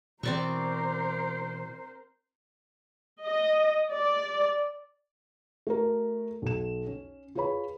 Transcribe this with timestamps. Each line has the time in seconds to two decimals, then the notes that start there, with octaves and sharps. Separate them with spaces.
0.23 B2 E3 C4 A#4 C5 D5 C#6
3.25 D#5
3.93 D5
5.67 A3 F#4 A#4
6.42 B1 E7
6.87 C#4
7.35 F4 G#4 B4 C#5 B5